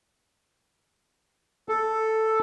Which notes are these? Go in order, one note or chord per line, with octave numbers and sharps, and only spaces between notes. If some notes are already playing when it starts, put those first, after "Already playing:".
A4